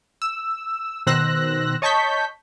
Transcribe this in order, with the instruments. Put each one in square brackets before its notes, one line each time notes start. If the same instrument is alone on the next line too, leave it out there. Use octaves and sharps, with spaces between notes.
[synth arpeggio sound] E6
B2 D#3 C5 E6 F#6 A#6
C#5 D#5 A5 C#6 G6 B6